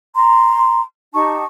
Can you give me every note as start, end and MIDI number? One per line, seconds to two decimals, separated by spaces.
0.15 0.82 82
0.15 0.82 84
1.14 1.44 63
1.14 1.44 67
1.14 1.44 81
1.14 1.44 85